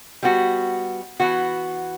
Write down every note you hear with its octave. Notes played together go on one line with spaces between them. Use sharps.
G3 B3 F#4
E3 B3 F#4